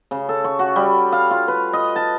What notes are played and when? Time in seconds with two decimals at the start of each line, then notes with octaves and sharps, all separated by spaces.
0.11 C#3
0.29 A4
0.44 C#6
0.59 F#4
0.76 G3
1.12 F5
1.31 F4
1.48 B4
1.73 D#5
1.96 A5